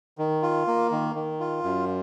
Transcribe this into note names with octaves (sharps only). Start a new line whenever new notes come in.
D#3
F4
A#3
D#3
D#3
F4
F#2